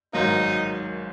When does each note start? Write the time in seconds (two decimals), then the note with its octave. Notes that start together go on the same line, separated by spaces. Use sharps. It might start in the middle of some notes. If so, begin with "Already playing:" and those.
0.13 G#1 G#2 F#3 A#3 D#4